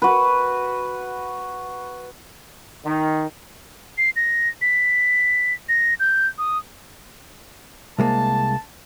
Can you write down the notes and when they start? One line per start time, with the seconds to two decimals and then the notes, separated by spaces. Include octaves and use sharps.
0.02 F#4 B4
2.85 D#3
3.98 C7
4.16 A#6
4.61 B6
5.69 A#6
6.00 G6
6.38 D#6
7.98 C2 G#3 A#3 A5